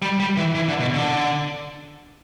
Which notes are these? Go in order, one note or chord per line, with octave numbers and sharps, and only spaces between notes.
G3
G3
E3
E3
D3
B2
D3